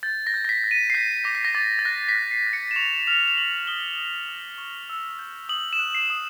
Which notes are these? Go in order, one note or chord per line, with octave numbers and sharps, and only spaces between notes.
G6 A6
A#6
G6
A#6
B6
G6
D#7
C7
G6 B6
D6 A#6
B6
A#6
D6 A6
A6
F#6 A#6
B6
F#6
C7
F#6
C#7
E7
C#6 F7
F6 F7
F7
C#6 F#7
D#6 G7
D#6
D#6
C#6
E6
G6
D#6 F#7
E7
F#6
C7
D#6